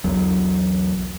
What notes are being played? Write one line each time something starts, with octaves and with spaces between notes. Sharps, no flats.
B1 E2 F#3